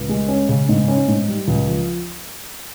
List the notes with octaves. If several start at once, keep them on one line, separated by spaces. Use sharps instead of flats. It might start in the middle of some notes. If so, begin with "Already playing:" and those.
Already playing: C#2
G#3
C#4
C#3
G#2
C#4
G#2
G3
C#2
F3